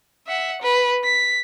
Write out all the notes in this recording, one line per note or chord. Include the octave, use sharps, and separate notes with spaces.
E5 F#5
B4
B6